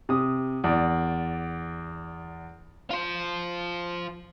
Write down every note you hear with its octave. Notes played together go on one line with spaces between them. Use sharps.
C3 D#6
E2 D5
F4 C5